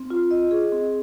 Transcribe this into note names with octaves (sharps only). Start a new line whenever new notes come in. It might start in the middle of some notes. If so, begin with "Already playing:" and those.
Already playing: C4
F4
D#5
G#4
C4